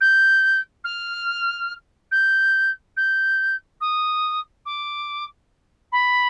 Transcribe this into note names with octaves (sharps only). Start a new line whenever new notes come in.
G6
F6
G6
G6
D#6
D6
B5